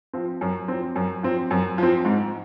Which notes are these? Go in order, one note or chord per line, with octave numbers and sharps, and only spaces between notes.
F3 C4
F#2
F3 C4
F#2
F3 C4
F#2
F3 C4
G#2